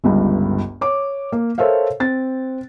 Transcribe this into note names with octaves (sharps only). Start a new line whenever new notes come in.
G1 C#2 G2
C#5 D6
A#3
A4 A#4 C5 C#5 E5 F5
C4 A6